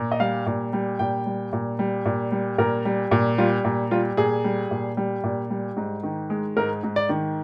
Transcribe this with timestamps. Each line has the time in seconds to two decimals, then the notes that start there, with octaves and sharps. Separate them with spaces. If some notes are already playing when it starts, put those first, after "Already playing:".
Already playing: A#2
0.12 D#5
0.20 G3 F5
0.46 A#2
0.73 G3
0.99 A#2 G5
1.26 G3
1.53 A#2
1.79 G3
2.06 A#2
2.32 G3
2.58 A#2 A#4
2.85 G3
3.11 A#2
3.38 G3 F4
3.65 A#2
3.91 G3 F4
4.17 A#2 G#4
4.44 G3
4.71 A#2
4.97 G3
5.24 A#2
5.50 G3
5.77 G#2
6.03 D#3
6.30 G#3
6.56 G#2 A#4
6.83 G#2
6.96 D5
7.09 D#3